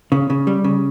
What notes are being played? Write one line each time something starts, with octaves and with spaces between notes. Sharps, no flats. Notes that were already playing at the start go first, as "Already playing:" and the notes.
C#3
C#3
G3
C#3